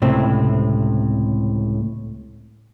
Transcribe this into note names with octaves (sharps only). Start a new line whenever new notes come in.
C#2 A2 C3 C4